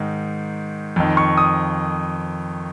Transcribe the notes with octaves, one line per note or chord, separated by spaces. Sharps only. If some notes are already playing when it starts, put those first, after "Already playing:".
Already playing: G#2 D#3
F2 D#3
C#6
D#6